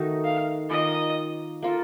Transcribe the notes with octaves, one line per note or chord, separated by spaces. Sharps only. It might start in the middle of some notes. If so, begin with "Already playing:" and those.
Already playing: D#3 A3 D#4 F#4
F5
D#3 A#3 F4 D#5
A#3 F4 A4